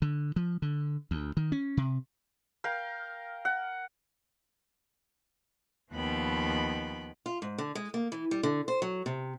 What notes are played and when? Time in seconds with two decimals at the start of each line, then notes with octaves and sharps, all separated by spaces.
0.02 D3
0.36 F3
0.62 D3
1.11 D2
1.37 D#3
1.52 C#4
1.77 C3
2.64 A#4 F5 G5
3.45 F#5
5.94 D#2 F3 B3 G5 B5 F#6
7.26 F4
7.42 G#2
7.58 D3
7.75 G#3
7.94 A#3
8.12 E3
8.31 G3
8.43 D3
8.68 C5
8.82 F#3
9.06 C3